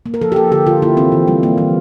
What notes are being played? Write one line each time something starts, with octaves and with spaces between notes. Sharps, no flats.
A#3
A#4
F3 A4
G4
A#3 A4
D3 G4
D3 F4
A#3 E4
E3 C4
E3
G3
A#3
E3